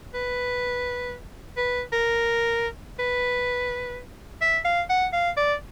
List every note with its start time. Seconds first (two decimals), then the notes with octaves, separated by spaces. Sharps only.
0.14 B4
1.57 B4
1.93 A#4
2.99 B4
4.41 E5
4.65 F5
4.90 F#5
5.13 F5
5.37 D5